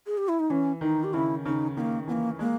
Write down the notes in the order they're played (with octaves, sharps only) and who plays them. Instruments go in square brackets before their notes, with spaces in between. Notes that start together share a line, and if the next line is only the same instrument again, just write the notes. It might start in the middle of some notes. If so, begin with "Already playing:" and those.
[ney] G#4
G4
E4
D#4
[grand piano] E3 [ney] C#4
[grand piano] D#3 [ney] D#4
[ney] G4
[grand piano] C#3 [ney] E4
[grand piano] C#3 [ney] D#4
[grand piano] D#3 [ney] B3
[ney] A#3
[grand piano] E3 [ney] B3
[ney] A#3
[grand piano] G#3 [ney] A#3